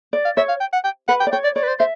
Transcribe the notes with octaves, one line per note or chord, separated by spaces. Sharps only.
D5
F5
C#5 E5
F5
G5
F#5
G5
B4 F#5
G5
D5
C#5 G5
D5
C#5 D5
B4
C5
C5 E5